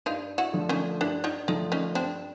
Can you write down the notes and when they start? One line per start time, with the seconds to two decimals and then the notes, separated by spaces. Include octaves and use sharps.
0.06 G2 D#4 F4
0.38 E4 F#4
0.53 D3 F3 A3
0.69 C#4 D#4
1.01 G2 D4 E4
1.24 D#4 F4
1.48 D3 F3 A3 D#4 F4
1.72 C#4 D#4
1.95 G2 C4 D4